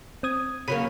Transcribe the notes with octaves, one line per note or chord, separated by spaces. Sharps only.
C4 D#6 G#6
C#3 F#3 A#3 B5 D#7